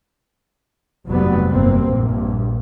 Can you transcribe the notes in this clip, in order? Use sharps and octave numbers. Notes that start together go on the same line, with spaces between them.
F1 G2 F#3 G3 B3
G1 G2 A#3 C4
A#1 G2